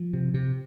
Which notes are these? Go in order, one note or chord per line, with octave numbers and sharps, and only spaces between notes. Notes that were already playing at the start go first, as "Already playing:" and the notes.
Already playing: F3
C3
C3